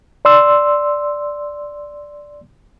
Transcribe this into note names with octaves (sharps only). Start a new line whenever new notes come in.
D5 C6 E6